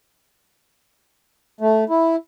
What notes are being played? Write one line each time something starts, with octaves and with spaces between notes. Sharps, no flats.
A3
E4